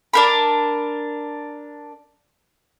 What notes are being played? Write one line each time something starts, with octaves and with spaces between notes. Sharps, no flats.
D4 A#4 B5